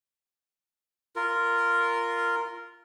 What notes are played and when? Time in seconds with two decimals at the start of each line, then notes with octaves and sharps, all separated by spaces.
1.16 F4 A#4